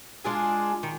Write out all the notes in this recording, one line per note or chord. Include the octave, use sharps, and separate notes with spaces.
G#3 D4 F4 G#4
D#3